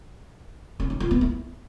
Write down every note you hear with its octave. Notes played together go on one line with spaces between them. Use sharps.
C#4
D#4
F4
B3
E4